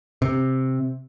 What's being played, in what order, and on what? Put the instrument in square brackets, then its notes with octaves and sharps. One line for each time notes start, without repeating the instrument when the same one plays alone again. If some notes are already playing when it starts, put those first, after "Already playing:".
[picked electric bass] C3